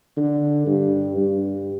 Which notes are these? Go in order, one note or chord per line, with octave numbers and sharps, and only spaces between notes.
D3
G2
G2